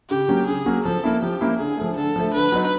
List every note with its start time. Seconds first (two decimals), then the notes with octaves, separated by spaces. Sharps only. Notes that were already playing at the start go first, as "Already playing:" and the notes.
0.10 C#3 G4
0.28 F#3 A#3 C#4
0.47 C#3 G#4
0.66 F#3 A#3 C#4
0.85 F3 A4
1.04 A#3 C#4 E4
1.22 F3 G4
1.41 A#3 C#4 E4
1.59 D3 G#4
1.77 F3 A3
1.96 D3 A4
2.16 F3 A3
2.34 D3 B4
2.52 F#3 B3 D#4